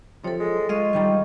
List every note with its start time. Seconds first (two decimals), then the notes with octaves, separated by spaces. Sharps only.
0.24 C3 F3 A4 C#5
0.40 G#3
0.69 G#3 F4 D#5 F5 C#6
0.93 G2 D#3 G3